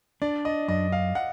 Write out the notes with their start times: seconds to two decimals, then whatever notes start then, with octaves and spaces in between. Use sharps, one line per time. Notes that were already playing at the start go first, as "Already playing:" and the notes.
0.22 D4 D5
0.45 D#5
0.68 F#2 D#5
0.92 F5
1.15 F#5